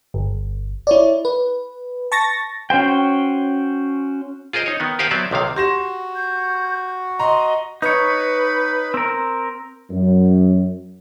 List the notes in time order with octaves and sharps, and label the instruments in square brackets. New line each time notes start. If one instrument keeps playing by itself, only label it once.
[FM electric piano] G1
E4 C#5 D5
B4
A5 C#6 A6 A#6
[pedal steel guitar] C#4 F#4 C5 G5
[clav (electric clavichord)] F4 G#4 A#4 C5 D#5
D#4 C#5
D#3 B3
G4 A#4 C5 F5 F#5 G#5
F#3 B3 C4 D5 E5
B1 C3 D#3 F5
[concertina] F#4 [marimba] G4 [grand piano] C6 A#6 E7
[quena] G6
[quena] D#5 [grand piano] A#5 C6
[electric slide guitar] D#4 C#5 [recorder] B4
[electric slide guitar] C4 A#4
[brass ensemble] F#2